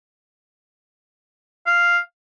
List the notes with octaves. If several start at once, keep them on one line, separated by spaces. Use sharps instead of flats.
F5